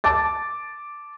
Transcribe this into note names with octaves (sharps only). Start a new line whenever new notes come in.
A5 D6 A6